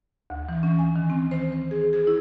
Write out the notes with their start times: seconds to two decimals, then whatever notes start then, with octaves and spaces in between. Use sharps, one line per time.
0.30 D2
0.49 E3
0.63 C#4
0.79 G#5
0.96 D#3
1.10 C4
1.31 C5
1.52 C5
1.71 G#4
1.93 G#4
2.07 E4